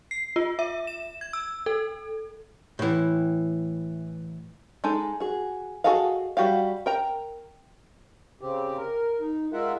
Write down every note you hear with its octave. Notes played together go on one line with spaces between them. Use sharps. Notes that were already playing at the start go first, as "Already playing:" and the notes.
C7
F4
E5
E7
G#6
E6
A4
A2 E3
G#3 D#4 A4 G#5
F#4 G#4
F#4 G#4 A4 D#5 F5
G3 F#4 G4 F5
A#4 G5 A#5
C#3 C4 G4
A#4
D#4
G#3 F4 A#4 E5 F#5